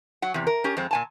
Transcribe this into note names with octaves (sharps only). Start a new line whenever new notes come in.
F#3 F#5
E2 C3
A#4
C#4 G4 A#4
F2 G#3 C4
A#2 G#5 A5